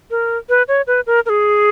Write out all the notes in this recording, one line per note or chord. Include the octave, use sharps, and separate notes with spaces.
A#4
B4
C#5
B4
A#4
A#4
G#4